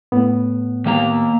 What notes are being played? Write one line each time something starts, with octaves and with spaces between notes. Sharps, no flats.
A2 B3
D#3 A#3 A#5